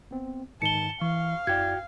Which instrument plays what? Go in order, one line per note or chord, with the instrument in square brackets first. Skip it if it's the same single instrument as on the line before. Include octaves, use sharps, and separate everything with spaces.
[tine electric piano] B3 C4
[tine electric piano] G#2 D#3 D#4 [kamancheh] A5 [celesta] C#7 G7
[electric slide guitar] E3 [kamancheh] F5 [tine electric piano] C#6
[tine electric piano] F#2 E4 D5 [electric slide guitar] F#4 G5 [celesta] G#6